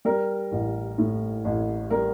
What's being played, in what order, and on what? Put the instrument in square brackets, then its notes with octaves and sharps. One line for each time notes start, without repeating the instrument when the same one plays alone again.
[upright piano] G3 A#4
A1
A2
A1
G3 A#4